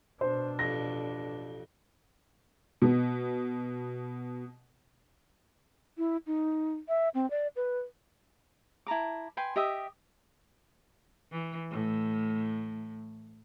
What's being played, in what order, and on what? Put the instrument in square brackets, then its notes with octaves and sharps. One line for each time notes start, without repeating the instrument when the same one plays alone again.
[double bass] B2 D4 [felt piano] C5
[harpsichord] A1 F2 [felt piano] A#6
[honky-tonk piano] B2 B3
[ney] E4
D#4
E5
C4
D5
B4
[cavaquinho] E4 A5 A#5 D6
B4 G5 G#5 C6
G4 D#5 E5 D#6
[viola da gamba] E3
A2